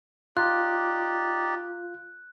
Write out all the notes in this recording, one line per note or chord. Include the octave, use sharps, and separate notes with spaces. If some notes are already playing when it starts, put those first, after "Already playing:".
D#4 F4 G4 D5 F#6